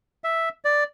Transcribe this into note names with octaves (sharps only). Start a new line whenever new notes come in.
E5
D5